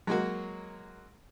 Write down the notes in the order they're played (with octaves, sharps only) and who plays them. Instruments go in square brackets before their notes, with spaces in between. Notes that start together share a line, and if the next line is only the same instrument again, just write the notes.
[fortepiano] F#3 G#3 A#3 F#4